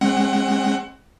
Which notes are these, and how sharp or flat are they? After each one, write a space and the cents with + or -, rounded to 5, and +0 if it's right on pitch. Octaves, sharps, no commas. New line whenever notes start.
G#3 -20 C4 +45 F#5 +25